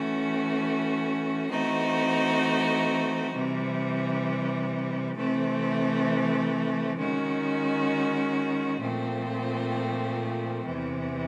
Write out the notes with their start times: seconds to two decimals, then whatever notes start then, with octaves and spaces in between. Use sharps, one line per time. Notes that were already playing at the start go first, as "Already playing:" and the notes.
Already playing: E3 A3 C#4 F#4
1.50 E3 A3 C4 D#4 F#4
3.34 C3 E3 G3
5.16 C3 E3 A3 C4
6.99 D#3 G#3 C#4 F#4
8.81 A#2 F3 A3 C4
10.64 E2 C3 E3